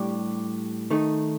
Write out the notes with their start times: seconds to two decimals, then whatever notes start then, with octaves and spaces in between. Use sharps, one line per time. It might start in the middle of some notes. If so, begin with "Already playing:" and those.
Already playing: A2 G3 D4 G4
0.91 D#3 A3 D#4